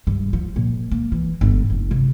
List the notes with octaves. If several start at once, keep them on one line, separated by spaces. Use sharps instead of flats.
G2
F3
A#2
A#3
E3
G1
F#1
C3